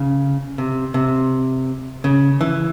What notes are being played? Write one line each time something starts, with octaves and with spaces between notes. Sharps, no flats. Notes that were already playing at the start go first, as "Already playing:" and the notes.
Already playing: C#3
C3
C3
C#3
E3